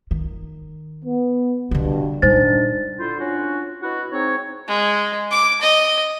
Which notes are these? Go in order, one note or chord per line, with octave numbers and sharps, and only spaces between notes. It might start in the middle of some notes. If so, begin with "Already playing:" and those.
D#3
B3
G2 B2 D3 D4
A#2 D#3 G3 D4 D#4 C5 A6
D3 E4 F4 C5
C#4 D4 F4 F#4
B2 E4 F#4
G#2 C4 D#4 C#5
G#3
D6
D#5